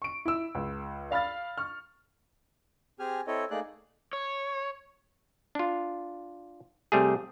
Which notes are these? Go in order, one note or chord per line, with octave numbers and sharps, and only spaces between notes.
C#6 D7
E4 E6
C#2
D5 F5 B5 F6 A6
C#6 F6
C4 G4 G#4 G#5 F6
C4 E4 A4 C#5 D#5
A3 A#3 D#4 G#4 D5 F#6
C#5
D4 F4
C3 G3 A3 G#4